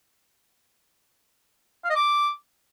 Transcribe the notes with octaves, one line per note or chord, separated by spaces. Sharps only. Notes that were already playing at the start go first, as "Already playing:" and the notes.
F5
D#5
D6